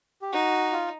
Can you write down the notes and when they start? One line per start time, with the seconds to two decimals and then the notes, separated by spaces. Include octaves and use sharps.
0.22 G4
0.32 D#4 F#4
0.73 F4